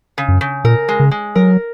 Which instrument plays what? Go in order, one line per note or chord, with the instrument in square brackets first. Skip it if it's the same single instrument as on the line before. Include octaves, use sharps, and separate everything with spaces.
[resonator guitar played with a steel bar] C#3
[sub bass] F#2
[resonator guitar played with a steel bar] C#3
[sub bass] A#2 [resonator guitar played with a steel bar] A#4
[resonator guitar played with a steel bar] G#3
[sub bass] C#3
[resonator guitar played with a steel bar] G#3
[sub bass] F#3 [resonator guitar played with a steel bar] A#4